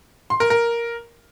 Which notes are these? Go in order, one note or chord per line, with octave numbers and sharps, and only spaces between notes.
C6
A#4
A#4